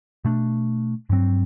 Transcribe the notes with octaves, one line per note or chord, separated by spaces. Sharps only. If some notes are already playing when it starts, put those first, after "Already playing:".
B2 A3 D4
G2 F#3 C4